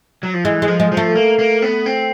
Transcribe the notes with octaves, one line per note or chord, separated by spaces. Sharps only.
F#3
F3
E3 G#3
G#3
F3
G#3
F3
A3
A#3
A#3
B3
C4